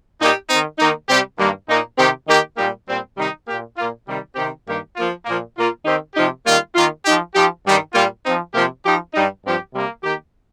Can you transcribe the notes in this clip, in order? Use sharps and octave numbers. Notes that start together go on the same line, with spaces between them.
A#2 A#3 D#4 G4
D#3 C4 D#4
D#3 A#3 D#4
C3 G3 C4 G4
G2 D#3 G3 A#3
A#2 A#3 D#4
C3 D#3 C4 G4
D#3 A#3 D#4 G4
A#2 G3 A#3 D#4 G4
A#2 G3 C4
C3 D#3 G3 D#4
A#2 A#3 G4
A#2 A#3 F4
C3 D#3 G3
C3 D#3 C4 G4
G2 D#3 A#3 G4
F3 A#3 F4
A#2 F3 A#3
A#2 A#3 F4
D#3 C4 D#4 G4
C3 F3 D#4 G4
D#3 G3 A#3 F4
D#3 A#3 F4
F3 D#4 G4
F3 D#4 G4
G2 D#3 G3
A#2 G3 A#3 F4
F3 C4 D#4
C3 F3 A#3 G4
F3 D#4 G4
G2 G3 D#4
G2 F3 C4 G4
C3 G3 A#3
D#3 A#3 G4